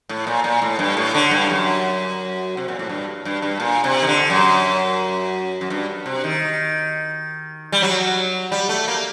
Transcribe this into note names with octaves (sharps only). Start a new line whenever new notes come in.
A2
A#2
A#2
A2
G2
A2
D3
G2
F#2
C3
A#2
A2
G2
G2
G2
A#2
C3
D#3
D3
F#2
F#2
G2
C3
D#3
G3
F#3
G3
A3
A#3